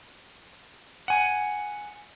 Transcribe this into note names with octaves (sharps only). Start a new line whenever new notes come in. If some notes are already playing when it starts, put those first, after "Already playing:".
F#5 G#5